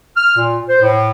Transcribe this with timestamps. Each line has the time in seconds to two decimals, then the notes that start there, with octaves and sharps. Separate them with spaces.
0.16 F6
0.36 A#2
0.68 C5
0.81 A2